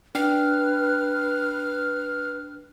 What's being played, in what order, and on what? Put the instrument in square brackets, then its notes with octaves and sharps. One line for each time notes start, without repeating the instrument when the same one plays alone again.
[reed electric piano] D4 G5 [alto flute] B4 [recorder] F6